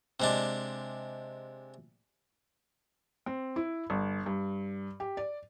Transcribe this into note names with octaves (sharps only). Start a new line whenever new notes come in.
C3 G#3 D4
C4
E4
G1
G2
G4
D5